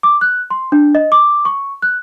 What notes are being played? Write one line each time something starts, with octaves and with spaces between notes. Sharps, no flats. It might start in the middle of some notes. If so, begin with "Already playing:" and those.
D6
F#6
C6
D4
D#5
D6
C#6
F#6